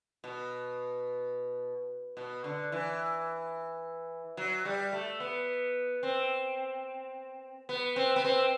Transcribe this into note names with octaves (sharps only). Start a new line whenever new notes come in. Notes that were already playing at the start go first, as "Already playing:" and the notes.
B2
B2
D3
E3
F#3
G3
A3
B3
C4
B3
C4
B3
C4